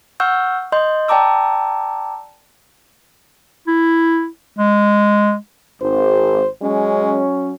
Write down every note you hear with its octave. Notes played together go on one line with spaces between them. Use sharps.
F#5 C#6 E6 F6 G6
D#5 C6 G6
D5 G5 A5 A#5 D6 E6
E4
G#3
G#1 C5
F#3 G#3 C#4